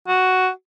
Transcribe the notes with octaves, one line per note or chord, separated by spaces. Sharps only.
F#4